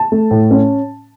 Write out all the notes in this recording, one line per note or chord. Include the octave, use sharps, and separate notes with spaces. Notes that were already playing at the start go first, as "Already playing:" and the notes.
Already playing: A5
A3
A2
C#4